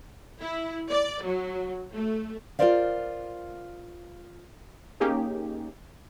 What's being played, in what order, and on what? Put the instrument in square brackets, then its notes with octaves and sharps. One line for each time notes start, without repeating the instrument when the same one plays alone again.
[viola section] E4
D5
F#3
A3
[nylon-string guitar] F4 G#4 A#4 C5 D5 F5
[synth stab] A#3 C#4 D#4 G4 G#4